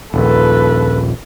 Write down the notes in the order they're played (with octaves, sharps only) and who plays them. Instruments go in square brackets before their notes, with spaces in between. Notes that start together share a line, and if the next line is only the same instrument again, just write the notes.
[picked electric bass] D#1 A#1 [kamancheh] A4 B4